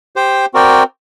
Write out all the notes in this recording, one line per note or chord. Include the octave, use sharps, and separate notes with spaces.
G4 C5 G5
C4 F#4 A#4 D5 G5